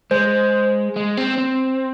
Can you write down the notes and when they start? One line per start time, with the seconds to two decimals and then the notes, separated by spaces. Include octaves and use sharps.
0.11 G#3 C5
0.96 G#3
1.17 C4
1.38 C4